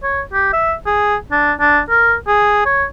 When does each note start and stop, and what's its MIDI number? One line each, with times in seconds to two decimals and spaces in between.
0.03 0.22 73
0.33 0.49 67
0.53 0.74 76
0.86 1.16 68
1.31 1.52 62
1.60 1.80 62
1.90 2.15 70
2.27 2.65 68
2.65 2.85 73